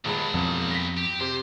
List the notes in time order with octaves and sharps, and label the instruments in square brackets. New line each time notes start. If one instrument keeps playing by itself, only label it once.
[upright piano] D#1 G#3 B5 [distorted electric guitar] B2 F#3
[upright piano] E1 [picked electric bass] F2
[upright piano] A#6 B6
[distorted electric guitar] G4
[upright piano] C3 [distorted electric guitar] C5